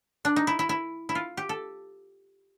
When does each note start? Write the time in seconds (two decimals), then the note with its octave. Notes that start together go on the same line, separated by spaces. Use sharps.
0.25 D4
0.36 D#4
0.47 E4
0.59 E4
0.69 E4
1.09 E4
1.15 F4
1.37 G4
1.49 A4